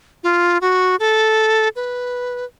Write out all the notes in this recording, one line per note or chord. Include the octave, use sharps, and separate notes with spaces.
F4
F#4
A4
B4